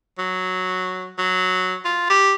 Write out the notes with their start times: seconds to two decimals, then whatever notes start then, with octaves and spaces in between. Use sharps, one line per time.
0.18 F#3
1.18 F#3
1.85 F4
2.10 G4